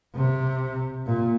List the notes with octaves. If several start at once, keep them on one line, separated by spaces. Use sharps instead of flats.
C3
A#2